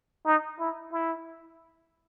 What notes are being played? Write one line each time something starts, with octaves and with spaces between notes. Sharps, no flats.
D#4
E4
E4